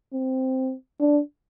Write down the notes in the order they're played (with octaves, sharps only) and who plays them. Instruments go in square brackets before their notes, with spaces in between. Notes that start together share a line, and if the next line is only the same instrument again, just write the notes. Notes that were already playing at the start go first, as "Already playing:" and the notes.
[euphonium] C4
D4